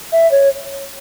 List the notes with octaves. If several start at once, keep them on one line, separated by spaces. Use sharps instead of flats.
E5
C#5